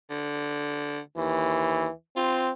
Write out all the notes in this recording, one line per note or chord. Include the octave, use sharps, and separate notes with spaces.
D3
D#2 E3
C4 F4